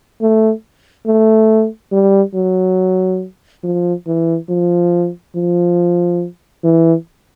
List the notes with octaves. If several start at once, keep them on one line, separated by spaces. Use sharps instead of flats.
A3
A3
G3
F#3
F3
E3
F3
F3
E3